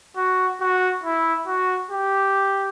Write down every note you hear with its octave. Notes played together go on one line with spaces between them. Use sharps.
F#4
F#4
E4
F#4
G4